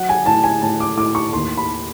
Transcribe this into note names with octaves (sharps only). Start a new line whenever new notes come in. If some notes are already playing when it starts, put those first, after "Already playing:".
Already playing: F#3 F#5
G#5
A2 A5
G#5
A2 A5
D6
A2 D6
C#6
D#2 C6
B5